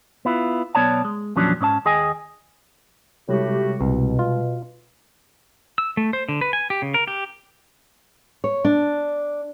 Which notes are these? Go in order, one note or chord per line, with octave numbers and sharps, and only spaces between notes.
B3 E4 F4
B1 G2 B3 C#5 D5 A5
G#3
E2 A#2 F3 F#3 C#4 D4
G#2 C#4 D5 A5
D#2 G#4 D#5 G5 G#5
A2 C3 G3 G#3 F#4 G4
C2 B2
F4
E6
A3
C5
D3
B4
G#5
G4
C#3
A#4
G4
C#5
D4